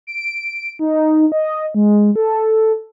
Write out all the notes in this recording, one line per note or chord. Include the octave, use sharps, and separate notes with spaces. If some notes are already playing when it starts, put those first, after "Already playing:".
D7
D#4
D#5
G#3
A4